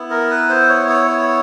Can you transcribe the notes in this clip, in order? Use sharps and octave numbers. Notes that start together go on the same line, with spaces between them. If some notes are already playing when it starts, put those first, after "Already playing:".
Already playing: B3 E4
A#4
B4
C5
C#5
C#5
C#5